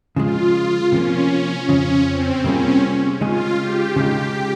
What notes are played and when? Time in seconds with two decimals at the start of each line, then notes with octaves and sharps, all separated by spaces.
0.16 C#3 F3 G#3 F4
0.92 C3 F3 A#3 C#4
1.69 F2 C#3 F3 C#4
2.07 C4
2.44 C3 G3 A#3 C#4 F4 G#4
3.21 C#3 G#3 D#4 F4 G#4
3.59 G4
3.96 C#3 G#3 D#4 G4